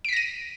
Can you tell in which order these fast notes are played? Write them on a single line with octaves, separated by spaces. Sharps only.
D7 B6 A#6 D#7